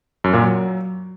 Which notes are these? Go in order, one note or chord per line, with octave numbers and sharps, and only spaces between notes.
F#2
A#2
F#3